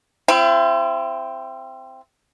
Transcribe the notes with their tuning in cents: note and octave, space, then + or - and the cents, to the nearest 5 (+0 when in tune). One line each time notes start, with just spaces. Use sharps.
C4 +0 E4 +40